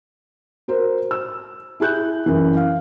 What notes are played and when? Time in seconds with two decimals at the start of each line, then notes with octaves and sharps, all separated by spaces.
0.68 F#4 A#4 C5
1.11 E6
1.80 E4 G#4 F#6 G6
2.26 F#2 E3
2.57 F5